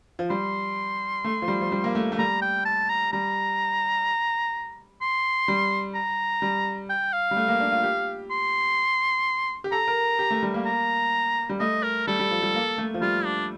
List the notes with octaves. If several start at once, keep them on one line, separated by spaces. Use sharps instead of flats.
F3
G3 C6
A3
F3
G3
F3
G3
A#3
A3
A3
G3 A#5
G5
A5
A#5
G3 A#5
C6
G3
A#5
G3
G5
F5
G3
A3
A#3
D4
F4
G4
C6
G4
A4 A#5
A#4
G4
A3
G3
A#3
A#5
G3
A3 D#5
A#4
G3 A4
G3
F3
G3
A#3
A3
F3
G3 F4
D4